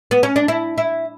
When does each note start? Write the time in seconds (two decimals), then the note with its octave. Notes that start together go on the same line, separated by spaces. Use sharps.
0.11 B3
0.23 C#4
0.36 D4
0.48 E4
0.78 E4